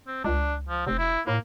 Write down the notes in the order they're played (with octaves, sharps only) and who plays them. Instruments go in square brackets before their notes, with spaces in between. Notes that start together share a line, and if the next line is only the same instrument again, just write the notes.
[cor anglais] C4
[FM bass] C#2 [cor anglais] D4
[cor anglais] F3
[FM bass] F1 [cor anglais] C4
[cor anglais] E4
[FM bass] A2 [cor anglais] A#3